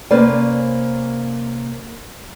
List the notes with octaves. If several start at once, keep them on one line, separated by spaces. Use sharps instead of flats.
C3 A#3 C#4 B4 C5 D5